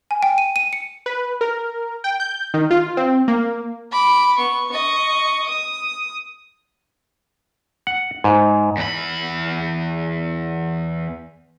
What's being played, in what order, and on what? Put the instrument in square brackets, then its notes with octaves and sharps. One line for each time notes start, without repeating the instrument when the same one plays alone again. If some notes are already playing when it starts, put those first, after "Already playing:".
[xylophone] G#5
G5
D#7
D#7
C#7
[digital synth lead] B4
A#4
G5
G6
D#3
F4
C4
A#3
[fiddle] B5 D6
B3 C#6
D#5 C#6
D#6
[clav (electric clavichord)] F#5
G#2
[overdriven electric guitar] E2 B5